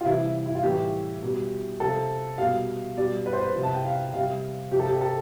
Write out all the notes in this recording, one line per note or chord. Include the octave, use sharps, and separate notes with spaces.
F4
C3 E3 G3 E4
E4
F4
A2 E3 G3 G4
B2 G3
C3 F3 A4
B2 G3 F5
B2 G3 D5
B4
C5
B4
C3 F3
A5
G5
F5
C3 G3 F5
C3 F3 G4
A4
G4
A4